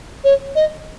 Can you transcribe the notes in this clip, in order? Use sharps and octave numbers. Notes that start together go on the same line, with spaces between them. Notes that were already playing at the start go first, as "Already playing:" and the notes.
C#5
D#5